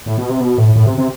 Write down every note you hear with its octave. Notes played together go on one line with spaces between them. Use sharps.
A2
B2
C3
B2
A2
A2
C3
C3